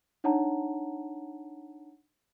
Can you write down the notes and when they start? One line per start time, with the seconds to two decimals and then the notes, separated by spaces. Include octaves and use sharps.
0.24 D4 D#4 C#5 F#5 A5 A#5